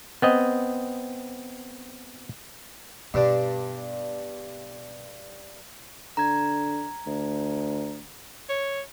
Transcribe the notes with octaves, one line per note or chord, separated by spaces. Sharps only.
B3 C4 D#5
G2 B2 D4
D3 A#5 G#6
D2
C#5